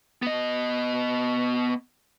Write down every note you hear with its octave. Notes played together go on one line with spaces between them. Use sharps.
B3 D#5